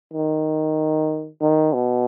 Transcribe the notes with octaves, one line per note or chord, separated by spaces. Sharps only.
D#3
D#3
B2